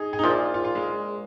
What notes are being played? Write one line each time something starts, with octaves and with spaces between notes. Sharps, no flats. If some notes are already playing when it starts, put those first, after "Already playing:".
Already playing: D#4 G#4
G#4
D#4
A#1 A#2 F3 F4
F4
F4
G#3